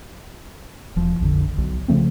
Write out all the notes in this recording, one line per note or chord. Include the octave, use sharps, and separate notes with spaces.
E1 F3
A#1 F2 D3
B1
C#3 F3 A3 C4